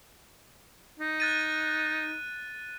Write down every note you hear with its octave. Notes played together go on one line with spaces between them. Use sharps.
D#4
F#6 A6 D#7